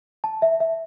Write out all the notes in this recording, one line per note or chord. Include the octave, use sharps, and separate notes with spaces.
A5
E5
E5